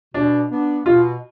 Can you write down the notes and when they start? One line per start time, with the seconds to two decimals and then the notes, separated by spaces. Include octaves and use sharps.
0.14 B2 D4
0.51 B3 D4
0.85 B2 F4